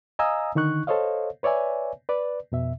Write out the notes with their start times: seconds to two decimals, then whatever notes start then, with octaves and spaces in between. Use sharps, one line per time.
0.19 D#5 F5 G#5 A#5 D#6 E6
0.55 D3 D#3 D#4 C#6 F#6
0.87 A4 C5 C#5 D#5 F5
1.43 B4 C#5 D5 E5 G#5
2.09 B4 D5
2.52 F2 B2 E5